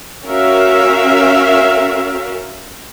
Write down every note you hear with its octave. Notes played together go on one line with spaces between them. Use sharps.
C#4 F#4 A#4 E5 F5